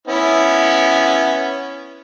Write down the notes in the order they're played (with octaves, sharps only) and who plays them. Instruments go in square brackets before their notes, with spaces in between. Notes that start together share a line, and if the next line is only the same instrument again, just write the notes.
[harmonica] B3 C#4 E4